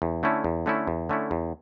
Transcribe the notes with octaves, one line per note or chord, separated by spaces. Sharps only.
E2
D3 A3 C#4 E4
E2
D3 A3 C#4 E4
E2
D3 A3 C#4 E4
E2